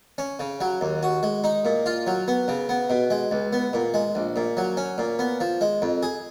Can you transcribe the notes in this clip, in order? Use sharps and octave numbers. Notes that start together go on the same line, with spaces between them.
C#4
C#3
F#3
D#2
F#4
G#3
D#4
A#2
F4
F#3
B3
C#3
B3
B2
G#3
C#2
B3
A#2
G#3
A#1
A#2
F#3
C#4
A#2
B3
F3
G#3
F2
G#4